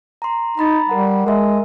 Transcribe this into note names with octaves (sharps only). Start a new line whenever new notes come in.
A#5 C6
D#4 A#5 B5 A6
G3 A#4 F#5
G#3 A#4 E5